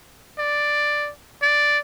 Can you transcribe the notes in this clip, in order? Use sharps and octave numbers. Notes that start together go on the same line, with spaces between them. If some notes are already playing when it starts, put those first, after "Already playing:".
D5
D5